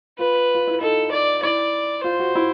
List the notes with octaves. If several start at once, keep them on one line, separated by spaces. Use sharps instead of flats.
F4 B4
F4
E4
D#4 A4
D5
E4 D5
F4 C5
F#4
E4